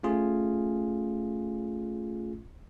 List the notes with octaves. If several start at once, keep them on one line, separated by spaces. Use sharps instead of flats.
A3 C#4 F4 G#4